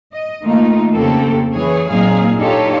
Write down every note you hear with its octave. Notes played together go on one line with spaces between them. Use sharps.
D#5
D#3 A3 A#3 D#4 F4
F2 C#3 A#3 C4 G4 A4
E3 G#4 C#5
A#2 F#3 C4 D#4 G#4 F5
D4 D#4 F4 G4 A4 C#5